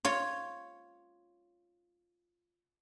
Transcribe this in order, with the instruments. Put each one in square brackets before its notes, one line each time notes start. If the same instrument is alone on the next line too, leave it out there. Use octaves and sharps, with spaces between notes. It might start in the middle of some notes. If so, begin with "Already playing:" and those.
[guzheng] F4 C#5